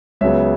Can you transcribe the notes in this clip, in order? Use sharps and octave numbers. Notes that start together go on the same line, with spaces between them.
C#2 C#3 F#3 B3 C#5 E5